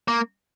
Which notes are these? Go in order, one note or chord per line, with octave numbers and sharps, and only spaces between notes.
A#3